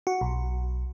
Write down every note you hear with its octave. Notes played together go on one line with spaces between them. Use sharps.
F#4
B1